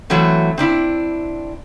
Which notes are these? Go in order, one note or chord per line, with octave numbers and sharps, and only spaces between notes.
E3 F#3 A3 C4
C4 D4 E4